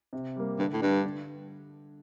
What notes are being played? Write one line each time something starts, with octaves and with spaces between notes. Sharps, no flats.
C3
G3 A#3
G2 D3
A2
G2 G3 D4 G4
D3